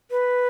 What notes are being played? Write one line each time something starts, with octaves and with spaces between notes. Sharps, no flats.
B4